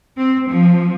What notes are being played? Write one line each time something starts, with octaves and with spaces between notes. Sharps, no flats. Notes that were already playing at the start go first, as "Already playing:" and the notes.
C4
F3